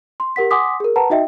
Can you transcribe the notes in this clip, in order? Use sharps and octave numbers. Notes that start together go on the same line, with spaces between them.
C6
G4 A#4 F#5 B6
F#5 G#5 C6 D6 D#6 B6
G#4 A#4
B4 F#5 A5 A#5
D#4 F#4 D#5 E5 G5